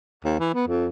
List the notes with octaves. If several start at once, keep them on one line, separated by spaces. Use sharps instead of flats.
D#2
E3
B3
F2